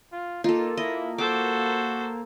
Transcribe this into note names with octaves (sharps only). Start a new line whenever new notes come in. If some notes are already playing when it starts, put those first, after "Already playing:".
F4
A#3 D#4 F4 A4
E4 D#5
F#4 A4 C5 D6